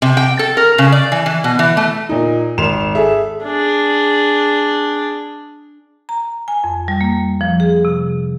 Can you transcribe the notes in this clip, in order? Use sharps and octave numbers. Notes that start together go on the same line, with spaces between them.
C3
G5
A4
A#4
C#3
D5
E3
E3
B2
E3
A3
A#2 D#4
G#1 C6 E7 F7
G#4 A4 E5
D4 G#4
A#5
G#5
F2
G3
A#3
F3
G#4
C3